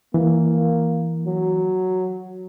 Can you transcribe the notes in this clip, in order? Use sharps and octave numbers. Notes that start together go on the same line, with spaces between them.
E3 A#3
F#3